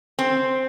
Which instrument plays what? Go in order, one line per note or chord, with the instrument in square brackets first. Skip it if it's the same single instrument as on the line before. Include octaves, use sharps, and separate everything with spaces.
[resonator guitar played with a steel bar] C4